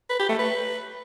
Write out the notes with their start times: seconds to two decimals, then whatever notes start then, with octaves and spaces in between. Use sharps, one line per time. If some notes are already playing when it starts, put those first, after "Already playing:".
0.10 B4
0.19 G4
0.29 A3
0.39 B4